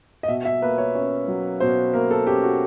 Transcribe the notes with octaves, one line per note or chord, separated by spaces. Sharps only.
D#5
B2 E5
E5
A#3 B4
C#5
C#4
F#3
B2 C5
A#3 A#4
A4
C#4 G4
F#4